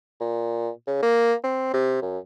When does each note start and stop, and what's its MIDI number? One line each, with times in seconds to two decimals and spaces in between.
0.20 0.70 46
0.87 0.98 49
1.03 1.34 58
1.44 1.70 60
1.73 1.99 48
2.02 2.18 42